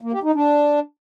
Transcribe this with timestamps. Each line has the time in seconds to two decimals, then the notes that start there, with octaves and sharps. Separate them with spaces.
0.01 A#3
0.13 G4
0.24 D#4
0.35 D4